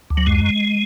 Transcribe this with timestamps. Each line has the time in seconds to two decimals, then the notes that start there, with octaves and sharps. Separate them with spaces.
0.10 D2
0.17 F#3
0.26 F#2 G#3